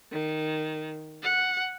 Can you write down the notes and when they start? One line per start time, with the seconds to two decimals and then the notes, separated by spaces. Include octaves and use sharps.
0.12 D#3
1.22 F#5